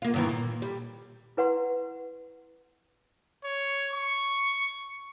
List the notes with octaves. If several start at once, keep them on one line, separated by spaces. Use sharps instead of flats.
A#3 F4
G2 D#3 E3
A#2
G3
E4 B4 F#5 C6
C#5
C#6